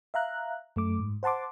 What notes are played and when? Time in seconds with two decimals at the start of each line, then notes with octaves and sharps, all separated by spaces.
0.14 E5 F5 A#5 F#6
0.76 F#2 A3 D6
0.99 G#2
1.23 C5 F#5 A5 C6 D6